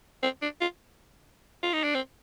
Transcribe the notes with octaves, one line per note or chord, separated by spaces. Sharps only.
C4
D4
F4
F4
D#4
D4
C4